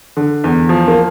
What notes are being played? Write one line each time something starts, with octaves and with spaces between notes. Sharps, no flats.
D3
E2
F3
A#3